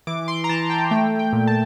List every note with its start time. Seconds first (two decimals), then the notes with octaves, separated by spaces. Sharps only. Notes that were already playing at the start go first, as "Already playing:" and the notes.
0.07 E3 D6
0.28 C6
0.44 A#5
0.49 E3 A5
0.70 G5
0.91 A3 G5
1.19 G5
1.33 A#2
1.47 A5